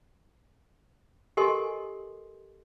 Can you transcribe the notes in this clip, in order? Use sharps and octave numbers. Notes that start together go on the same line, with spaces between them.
G4 A4 A#4 D#5 G#5 C6